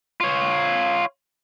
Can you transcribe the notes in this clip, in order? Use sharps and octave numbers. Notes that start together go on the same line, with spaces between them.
F4 C#5